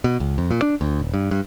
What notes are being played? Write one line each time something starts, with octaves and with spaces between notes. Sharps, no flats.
B2
C#2
F2
A#2
D4
D2
D#1
G2
G2